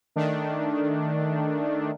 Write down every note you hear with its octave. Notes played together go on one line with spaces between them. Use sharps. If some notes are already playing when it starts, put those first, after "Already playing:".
D#3 A3 D4